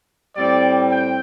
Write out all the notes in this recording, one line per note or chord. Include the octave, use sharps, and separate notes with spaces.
A2 G3 C4 D5
G5